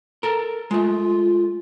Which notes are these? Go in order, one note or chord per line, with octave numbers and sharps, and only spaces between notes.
A4 A#4
G#3 A3 F4